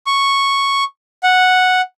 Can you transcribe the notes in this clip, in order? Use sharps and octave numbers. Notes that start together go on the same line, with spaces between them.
C#6
F#5